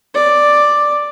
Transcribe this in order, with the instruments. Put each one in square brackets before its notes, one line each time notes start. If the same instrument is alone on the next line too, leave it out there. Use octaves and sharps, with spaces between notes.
[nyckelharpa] D5